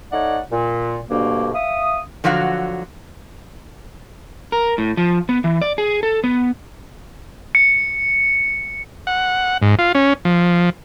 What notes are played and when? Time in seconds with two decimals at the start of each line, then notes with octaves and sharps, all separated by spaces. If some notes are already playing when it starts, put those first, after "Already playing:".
0.12 A3 D#4 C#5 D5 F#5
0.51 A#2
1.10 D2 G2 B2 A#3
1.54 E5 F5 D#6
2.24 D3 F3 F#3 F#4 F5
4.52 A#4
4.78 A2
4.97 F3
5.29 B3
5.44 E3
5.62 D5
5.78 G#4
6.03 A4
6.24 B3
7.55 C#7
9.07 F#5
9.62 G#2
9.79 F4
9.95 C#4
10.25 F3